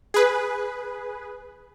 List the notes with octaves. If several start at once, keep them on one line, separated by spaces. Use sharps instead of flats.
G#4 B4